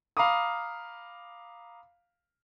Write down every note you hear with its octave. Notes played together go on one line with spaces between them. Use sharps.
F5 A#5 B5 D6 D#6